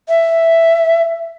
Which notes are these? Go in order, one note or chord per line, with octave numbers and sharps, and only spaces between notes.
E5